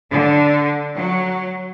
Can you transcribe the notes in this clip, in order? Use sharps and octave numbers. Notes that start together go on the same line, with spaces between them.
D3
F#3